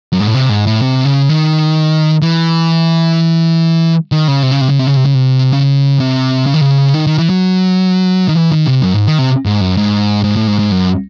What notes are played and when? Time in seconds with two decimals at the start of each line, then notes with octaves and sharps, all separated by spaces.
0.12 F#2
0.20 G#2
0.27 A2
0.34 C3
0.49 G#2
0.66 A2
0.82 C3
1.05 C#3
1.29 D#3
2.22 E3
4.12 D#3
4.28 C#3
4.43 C3
4.52 C#3
4.61 C3
4.69 C#3
4.79 C3
4.87 C#3
4.96 C3
5.05 C#3
5.14 C3
5.53 C#3
6.00 C3
6.47 C#3
6.54 D#3
6.61 C#3
6.94 D#3
7.07 D#3
7.18 E3
7.30 F#3
8.29 D#3
8.35 E3
8.52 D#3
8.67 C3
8.82 F#2
8.94 G#2
9.07 D#3
9.18 C3
9.46 G#2
9.61 F#2
9.77 G#2
10.24 G#2
10.37 A2
10.47 G#2
10.59 G#2
10.72 F#2